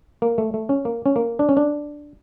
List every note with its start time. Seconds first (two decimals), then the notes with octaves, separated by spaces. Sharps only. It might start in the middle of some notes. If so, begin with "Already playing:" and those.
0.22 A#3
0.38 A3
0.54 A3
0.69 C#4
0.85 A#3
1.06 C#4
1.16 A#3
1.39 D4
1.49 C#4
1.57 D4